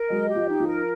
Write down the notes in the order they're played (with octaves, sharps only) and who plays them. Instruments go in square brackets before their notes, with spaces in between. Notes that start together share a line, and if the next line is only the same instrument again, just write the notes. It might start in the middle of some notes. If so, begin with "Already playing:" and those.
Already playing: [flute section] A#4
[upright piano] F#3 G#3 [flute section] D#5
[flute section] G4
[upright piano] F3
[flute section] D#4
[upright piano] F3
[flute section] A#4